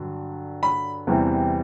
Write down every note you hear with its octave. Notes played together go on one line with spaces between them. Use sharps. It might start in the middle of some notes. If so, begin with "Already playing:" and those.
Already playing: G2 D3 F#3
B5
E2 C3 E3 G3